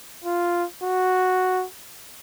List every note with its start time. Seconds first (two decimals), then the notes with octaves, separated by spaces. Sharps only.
0.24 F4
0.83 F#4